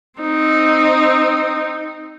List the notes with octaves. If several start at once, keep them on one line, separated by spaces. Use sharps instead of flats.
C4 D#4